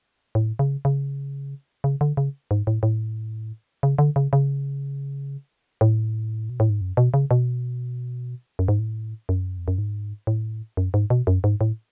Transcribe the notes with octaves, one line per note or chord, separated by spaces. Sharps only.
A2
C#3
C#3
C#3
D3
C#3
G#2
A2
A2
C#3
D3
C#3
C#3
A2
B2
A2
G#2
F#2
B2
C#3
B2
F#2
G#2
A2
F#2
F2
F#2
G#2
A2
F#2
G#2
B2
F#2
G#2
A2